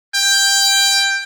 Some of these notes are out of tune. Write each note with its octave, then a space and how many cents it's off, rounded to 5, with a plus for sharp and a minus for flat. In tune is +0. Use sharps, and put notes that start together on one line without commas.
G5 +10